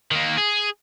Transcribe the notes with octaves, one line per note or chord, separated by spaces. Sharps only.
D#3 A#3
G#4